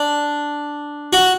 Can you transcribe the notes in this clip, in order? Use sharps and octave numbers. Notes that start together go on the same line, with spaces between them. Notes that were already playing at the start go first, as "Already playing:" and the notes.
Already playing: D4
F#4